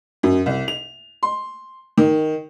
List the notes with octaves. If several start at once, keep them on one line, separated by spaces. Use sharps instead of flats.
F#2
C2
F7
C6
D#3